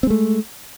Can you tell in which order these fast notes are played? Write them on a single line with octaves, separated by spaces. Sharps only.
C4 G#3 A3